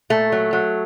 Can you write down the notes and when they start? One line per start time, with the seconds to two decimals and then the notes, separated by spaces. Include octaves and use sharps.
0.10 A#2 A3
0.32 F#3
0.53 F#3